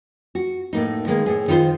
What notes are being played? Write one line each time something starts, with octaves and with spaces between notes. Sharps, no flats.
F#4
A2 A#3 D#4
D#3 G#3 A#3 B3
A2 G#4
D#3 F4 B4 C5